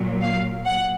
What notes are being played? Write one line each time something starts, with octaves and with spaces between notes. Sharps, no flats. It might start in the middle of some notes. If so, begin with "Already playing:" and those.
Already playing: A#2 F#3
F5
F#5